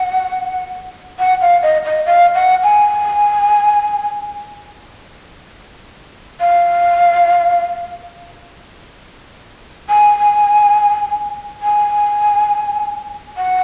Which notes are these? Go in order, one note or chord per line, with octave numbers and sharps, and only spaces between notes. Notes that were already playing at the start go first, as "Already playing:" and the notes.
Already playing: F#5
F#5
F5
D#5
D#5
F5
F#5
G#5
F5
G#5
G#5
F#5